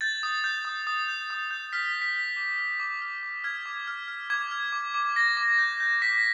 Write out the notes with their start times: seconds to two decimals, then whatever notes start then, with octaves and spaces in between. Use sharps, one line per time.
0.01 G6 A6
0.23 D#6
0.44 G6
0.65 D#6
0.87 D#6
1.08 G6
1.30 D#6
1.51 G6
1.73 F6 B6
1.95 F6
2.02 B6
2.16 F6
2.37 D6
2.58 F6
2.80 D6
3.01 F6
3.23 D6
3.44 F6 G#6
3.66 D6
3.87 F6
4.08 F6
4.30 D6 G#6
4.51 F6
4.72 D6
4.94 D6
5.15 D6 A#6
5.37 D6
5.58 G6
5.80 G6
6.02 D6 B6